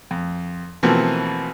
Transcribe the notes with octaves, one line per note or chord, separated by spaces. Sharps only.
F2
B2 E3 F3 A3 A#3 C4